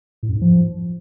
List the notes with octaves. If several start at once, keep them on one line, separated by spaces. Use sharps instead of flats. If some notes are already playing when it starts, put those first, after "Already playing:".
A2
F#2
G#2
F3